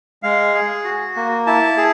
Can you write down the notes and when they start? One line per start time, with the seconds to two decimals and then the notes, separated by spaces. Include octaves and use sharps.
0.23 G#3 F5
0.54 G#4
0.84 F#4
1.16 A#3
1.47 E4 A5
1.78 G#4